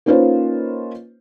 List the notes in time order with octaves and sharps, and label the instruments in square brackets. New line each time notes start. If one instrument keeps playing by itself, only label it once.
[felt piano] A#3 C#4 D#4 F4 B4 C5